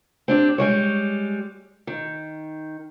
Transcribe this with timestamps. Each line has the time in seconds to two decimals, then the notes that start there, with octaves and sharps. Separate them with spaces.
0.28 C4 D4 G4
0.58 G3 G#3 C#5
1.87 D#3